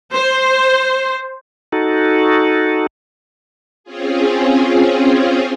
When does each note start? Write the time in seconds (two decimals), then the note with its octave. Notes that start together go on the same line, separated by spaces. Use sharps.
0.13 C5
1.72 D#4 F#4 A4
3.84 C4 C#4 F4 G#4